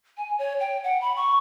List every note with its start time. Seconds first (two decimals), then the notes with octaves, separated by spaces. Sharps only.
0.17 G#5
0.39 C#5
0.60 G5
0.84 F#5
1.01 B5
1.16 C#6